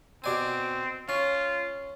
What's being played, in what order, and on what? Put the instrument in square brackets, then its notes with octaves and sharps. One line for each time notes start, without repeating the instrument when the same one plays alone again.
[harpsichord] B2 D5 G#5 [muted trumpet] C4
[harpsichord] C#4 [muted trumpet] F4